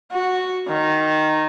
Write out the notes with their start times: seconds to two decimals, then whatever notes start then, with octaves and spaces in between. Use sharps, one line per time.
0.12 F#4
0.67 D#3